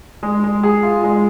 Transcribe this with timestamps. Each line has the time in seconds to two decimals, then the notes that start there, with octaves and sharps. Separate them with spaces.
0.23 G#3
0.44 G#3
0.63 G#4
0.83 F4
1.04 G#3